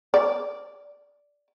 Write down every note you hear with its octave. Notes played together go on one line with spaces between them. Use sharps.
D5